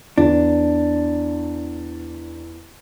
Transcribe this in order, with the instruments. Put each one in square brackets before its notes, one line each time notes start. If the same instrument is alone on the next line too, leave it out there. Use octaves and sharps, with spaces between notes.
[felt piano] E2 [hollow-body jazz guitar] D4